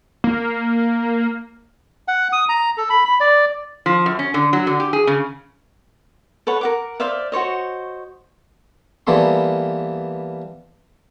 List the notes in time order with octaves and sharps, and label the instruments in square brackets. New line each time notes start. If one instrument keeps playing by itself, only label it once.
[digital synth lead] A#3
[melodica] F#5
D#6
A#5
A4
B5
B5
D5
[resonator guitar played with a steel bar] F3
F#2
C#4
D3
F#3
D3
G4
G#4
C#3
[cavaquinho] A4 B4 C#5 F#5
A#4 F#5 D6
C5 D5 E5 F5
F#4 C5 C#5 D#5
[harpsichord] E3 G3 A#3 B3 A4 C6